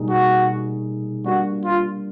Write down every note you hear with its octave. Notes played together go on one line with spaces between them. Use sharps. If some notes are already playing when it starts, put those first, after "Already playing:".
Already playing: B2 G3 A#3 D#4 G#4
F#4
G3 A#3 D4 F#4
F4